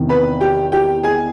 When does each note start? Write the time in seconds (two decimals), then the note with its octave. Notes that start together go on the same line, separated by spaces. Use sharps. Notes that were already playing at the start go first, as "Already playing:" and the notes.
Already playing: E2 C3 D#3
0.09 B4 B5
0.41 G4 G5
0.72 G4 G5
1.03 G#4 G#5